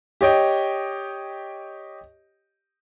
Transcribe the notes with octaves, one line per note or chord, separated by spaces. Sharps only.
G4 C#5 D#5 G5